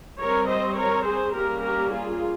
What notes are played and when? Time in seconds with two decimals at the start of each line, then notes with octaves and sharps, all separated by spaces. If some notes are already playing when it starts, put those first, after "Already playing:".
0.20 G3 C4 A#4 C#5
0.49 C5 D#5
0.77 A#4 C#5
1.05 G#4 C5
1.34 G3 A#3 C#4 G4 A#4
1.63 G4 A#4
1.91 F4 G#4